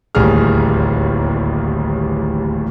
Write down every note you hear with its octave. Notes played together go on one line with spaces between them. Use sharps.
D1 A1 D#2 G3 G#4 F6